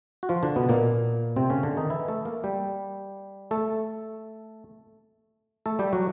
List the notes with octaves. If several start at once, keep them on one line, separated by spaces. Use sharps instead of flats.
F#4
F3 F4
D3 D4
B2 B3
A#2 A#3
C3 C4
C#3 C#4
D3 D4
D#3 D#4
E3 E4
A3 A4
A#3 A#4
G3 G4
A3 A4
A3 A4
G3 G4
F#3 F#4